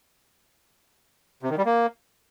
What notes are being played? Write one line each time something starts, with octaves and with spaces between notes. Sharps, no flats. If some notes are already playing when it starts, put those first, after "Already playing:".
C3
D#3
G3
A#3